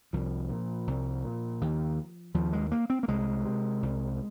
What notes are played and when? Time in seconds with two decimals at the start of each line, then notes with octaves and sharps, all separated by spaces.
0.13 C2 F3
0.50 A#2
0.87 C2
1.24 A#2
1.61 D#2
2.34 D#2 F3
2.53 G#3
2.71 A#3
2.90 C4
3.03 A#3
3.08 C2 G#3
3.45 C3
3.82 C2